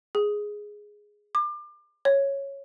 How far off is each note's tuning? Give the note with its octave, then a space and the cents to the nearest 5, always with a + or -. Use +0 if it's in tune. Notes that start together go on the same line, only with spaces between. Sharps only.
G#4 +0
D6 +30
C#5 -5